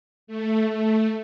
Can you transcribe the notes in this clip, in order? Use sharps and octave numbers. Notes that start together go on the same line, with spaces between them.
A3
A3